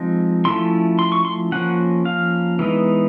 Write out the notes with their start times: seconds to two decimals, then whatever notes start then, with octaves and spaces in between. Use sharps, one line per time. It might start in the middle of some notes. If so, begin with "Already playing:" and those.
Already playing: F3 G#3 C4 D#4
0.45 F3 A3 C#4 E4 C6
0.99 C6
1.12 C#6
1.25 C6
1.52 F3 A#3 C#4 F#5
2.05 F5
2.59 E3 G#3 B3 D#4